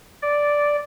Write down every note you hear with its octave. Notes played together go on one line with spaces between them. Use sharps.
D5